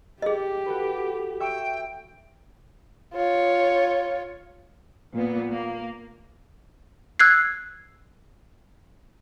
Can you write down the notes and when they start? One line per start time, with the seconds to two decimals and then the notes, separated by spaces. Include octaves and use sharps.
0.22 G4 G#4 D#5
0.66 F#4 A4 B4
1.40 E5 G5 C#6
3.14 F4 C#5
5.15 A#2 B3
5.52 A#3
7.19 E6 F#6 G#6 C7